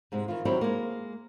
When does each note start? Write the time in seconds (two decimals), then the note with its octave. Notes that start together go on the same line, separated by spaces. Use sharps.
0.12 G#2 C3 G#3
0.28 D#3 E3 F4
0.45 D#3 F#3 G3 C4 E4
0.61 G#3 A#3